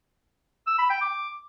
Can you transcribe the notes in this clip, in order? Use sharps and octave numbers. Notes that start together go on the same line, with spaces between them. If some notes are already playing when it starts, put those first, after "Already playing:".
E6
B5
G5
D6